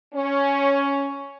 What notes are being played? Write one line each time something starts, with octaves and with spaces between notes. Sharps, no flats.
C#4